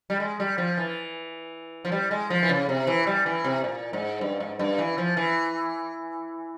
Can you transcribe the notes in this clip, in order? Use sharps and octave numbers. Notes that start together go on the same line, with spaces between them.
G3
G#3
G3
F3
E3
F3
G3
G#3
F3
E3
C#3
C3
E3
G3
E3
C3
A#2
G#2
G2
G#2
G2
E3
F3
E3